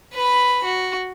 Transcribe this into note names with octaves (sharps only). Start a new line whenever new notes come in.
B4 B5
F#4